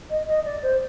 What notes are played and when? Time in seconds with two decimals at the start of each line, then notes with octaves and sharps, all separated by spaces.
0.09 D#5
0.27 D#5
0.45 D5
0.62 C5